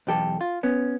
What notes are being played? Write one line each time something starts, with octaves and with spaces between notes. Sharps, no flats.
B1 E2 G4 A4
F4
B3 C#4